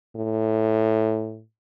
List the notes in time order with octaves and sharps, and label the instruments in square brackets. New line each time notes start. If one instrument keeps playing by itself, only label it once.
[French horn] A2